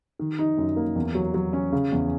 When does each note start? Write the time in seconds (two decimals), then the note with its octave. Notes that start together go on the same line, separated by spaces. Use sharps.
0.19 D#3
0.39 D#4
0.58 F#2
0.76 A#3
0.96 E2
1.15 F#3
1.34 F#3
1.53 C#4
1.72 C#3
1.92 E2